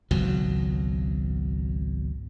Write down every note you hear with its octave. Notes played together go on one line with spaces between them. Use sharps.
G#1 C#2 B2 F#3